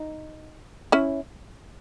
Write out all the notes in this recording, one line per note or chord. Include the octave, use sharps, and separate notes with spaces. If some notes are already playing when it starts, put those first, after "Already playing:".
Already playing: D#4
C#4 E4